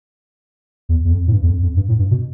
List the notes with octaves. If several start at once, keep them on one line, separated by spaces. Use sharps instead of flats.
E2
E2
F2
A2
G2
E2
F2
F2
G2
A2
G2
B2